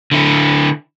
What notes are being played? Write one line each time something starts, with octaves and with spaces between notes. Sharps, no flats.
D3 E4